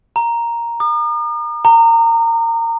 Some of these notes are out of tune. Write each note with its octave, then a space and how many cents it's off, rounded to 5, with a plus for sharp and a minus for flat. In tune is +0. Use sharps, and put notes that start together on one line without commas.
A#5 +0
D#6 -45
A#5 -25